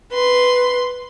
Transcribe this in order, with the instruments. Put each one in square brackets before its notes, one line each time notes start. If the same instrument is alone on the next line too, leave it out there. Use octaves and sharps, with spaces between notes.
[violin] B4 C6